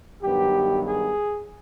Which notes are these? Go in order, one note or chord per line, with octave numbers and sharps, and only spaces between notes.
G2 D#3 F#3 B3 G4
G#4